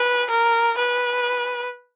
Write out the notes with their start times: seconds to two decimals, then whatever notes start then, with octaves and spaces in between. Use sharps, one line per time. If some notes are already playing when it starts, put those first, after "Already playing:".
Already playing: B4
0.30 A#4
0.78 B4